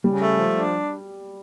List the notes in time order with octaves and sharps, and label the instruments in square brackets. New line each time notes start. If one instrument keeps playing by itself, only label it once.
[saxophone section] C#3 [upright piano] G3
[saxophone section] A3
F3
D4